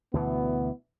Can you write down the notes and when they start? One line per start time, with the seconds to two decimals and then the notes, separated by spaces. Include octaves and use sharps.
0.14 D2 B2 E3 B3